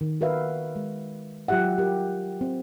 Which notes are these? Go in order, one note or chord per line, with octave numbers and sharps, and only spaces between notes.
D#3
F#4 A#4 B4 E5 F5
G#3
F#3 F4 G4 E5 F#5
G4 A#4
C4